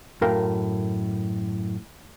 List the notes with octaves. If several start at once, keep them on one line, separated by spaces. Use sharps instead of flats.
F#2 A2 A#4 F5 G5